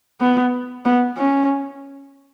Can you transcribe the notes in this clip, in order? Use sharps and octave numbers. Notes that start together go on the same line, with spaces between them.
B3
B3
C#4